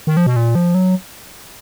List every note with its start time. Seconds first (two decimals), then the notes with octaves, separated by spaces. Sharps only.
0.07 D#3
0.17 F3
0.26 B2
0.36 A#2
0.55 F3
0.75 F#3